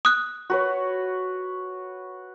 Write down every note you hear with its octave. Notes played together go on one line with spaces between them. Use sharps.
D#6 F#6
F#4 B4 C#5